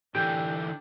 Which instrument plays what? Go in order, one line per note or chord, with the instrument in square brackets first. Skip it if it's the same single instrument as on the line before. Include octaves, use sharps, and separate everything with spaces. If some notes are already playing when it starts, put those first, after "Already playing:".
[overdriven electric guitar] D3 E3 [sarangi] D4 [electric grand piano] G4 [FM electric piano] G5 G#5